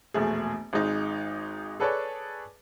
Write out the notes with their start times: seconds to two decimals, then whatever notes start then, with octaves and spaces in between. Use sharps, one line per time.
0.14 E1 A#1 A3 G#4
0.73 G#1 G#3 D#4
1.80 G#4 A4 B4 C#5 D5 A5